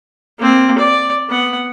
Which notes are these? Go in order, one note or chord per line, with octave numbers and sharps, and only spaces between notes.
A#3 C4
D5
B3 F#5